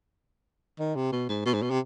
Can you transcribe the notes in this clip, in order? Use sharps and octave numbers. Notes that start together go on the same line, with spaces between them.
D#3
C3
B2
G#2
B2
G#2
B2
C3